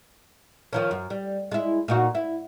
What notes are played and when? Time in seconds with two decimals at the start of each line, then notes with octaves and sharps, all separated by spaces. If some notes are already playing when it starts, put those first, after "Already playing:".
0.73 D#3 F3 C#4
0.91 F#2
1.10 G3
1.51 G#3 E4
1.88 A#2 D#4 F#4
2.15 E4